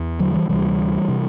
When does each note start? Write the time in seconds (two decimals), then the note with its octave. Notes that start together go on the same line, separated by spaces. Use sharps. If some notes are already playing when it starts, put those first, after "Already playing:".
Already playing: E2
0.19 D3 F#3
0.34 E3 G3
0.49 D2 C3 E3 G3
1.09 C3